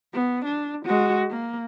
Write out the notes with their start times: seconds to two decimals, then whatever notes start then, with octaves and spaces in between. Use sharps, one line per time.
0.13 B3
0.44 D4
0.85 G#3 F#4
1.30 A#3